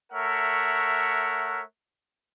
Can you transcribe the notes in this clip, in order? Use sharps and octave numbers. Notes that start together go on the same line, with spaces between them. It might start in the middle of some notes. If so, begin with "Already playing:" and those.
A3 A#4 C#5 E5 F#5